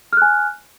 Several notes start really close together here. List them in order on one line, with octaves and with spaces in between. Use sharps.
F6 F#6 G#5